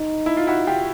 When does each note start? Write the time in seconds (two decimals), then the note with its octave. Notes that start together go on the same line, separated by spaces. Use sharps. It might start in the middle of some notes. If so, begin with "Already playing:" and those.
Already playing: D#4
0.26 E4
0.37 F4
0.47 E4 F#4
0.67 F4 G4